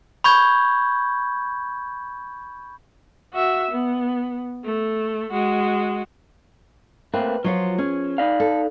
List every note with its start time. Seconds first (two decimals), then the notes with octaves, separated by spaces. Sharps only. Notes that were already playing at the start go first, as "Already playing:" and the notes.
0.24 B5 C#6 G6 G#6
3.33 F#4 E5
3.71 B3
4.65 A3
5.31 G#3 F#4
7.14 A3 A#3 C4 B4
7.44 F3 F#3 F4 C#5
7.78 C#4 G#4
8.18 D#4 D5 F5
8.40 A4